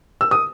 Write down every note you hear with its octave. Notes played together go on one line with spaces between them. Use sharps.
E6
D#6